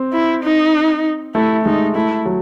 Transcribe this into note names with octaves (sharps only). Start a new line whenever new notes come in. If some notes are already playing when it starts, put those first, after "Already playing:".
Already playing: C4
E4
D#4
A3 E4
G#3 D#4
A3 E4
F#3